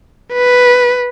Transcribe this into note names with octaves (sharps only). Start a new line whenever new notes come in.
B4